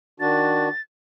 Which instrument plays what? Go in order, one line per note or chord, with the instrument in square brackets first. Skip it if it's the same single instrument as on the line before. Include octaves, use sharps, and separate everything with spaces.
[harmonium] D#3 D4 F#4 [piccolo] A6